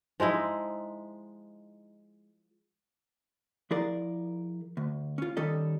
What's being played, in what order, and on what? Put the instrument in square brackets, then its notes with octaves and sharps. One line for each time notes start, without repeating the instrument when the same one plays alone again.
[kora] F3 G#3 D#4 E4
[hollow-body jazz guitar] F3 E4 G#4 A#4 D5
D2
C#4 F4
D#3 G3 C#4 A4 D#5